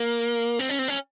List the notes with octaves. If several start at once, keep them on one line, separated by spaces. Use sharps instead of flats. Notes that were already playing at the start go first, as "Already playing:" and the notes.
Already playing: A#3
C4
C#4
C4
C#4